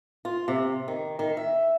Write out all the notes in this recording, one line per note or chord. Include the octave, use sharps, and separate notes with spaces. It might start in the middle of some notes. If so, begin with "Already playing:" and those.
F4
C3
D#3
D#3
E5